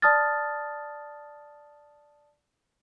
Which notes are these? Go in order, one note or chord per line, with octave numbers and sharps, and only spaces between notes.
D5 A5 D#6 F6 A6